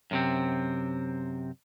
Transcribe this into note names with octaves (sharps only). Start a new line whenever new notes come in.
F#2 C3 C4